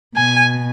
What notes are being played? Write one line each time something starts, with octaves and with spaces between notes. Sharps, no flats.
B2 G#5